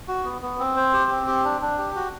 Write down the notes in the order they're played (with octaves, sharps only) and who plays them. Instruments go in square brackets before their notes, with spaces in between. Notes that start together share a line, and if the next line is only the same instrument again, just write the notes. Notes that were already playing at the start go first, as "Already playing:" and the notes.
[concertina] F#4
B3
B3
C4
C5
G4
C4
G4
D4
D4
G4
F#4